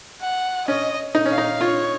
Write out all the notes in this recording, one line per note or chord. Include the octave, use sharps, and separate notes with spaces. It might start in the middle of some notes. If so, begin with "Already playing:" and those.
F#5
C#4 D#5
D#4
C#4 F5
D#4
F4 C#5